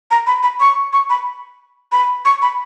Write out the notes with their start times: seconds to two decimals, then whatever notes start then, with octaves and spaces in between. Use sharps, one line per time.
0.11 A#5
0.27 B5
0.43 B5
0.60 C#6
0.93 C#6
1.10 B5
1.92 B5
2.25 C#6
2.42 B5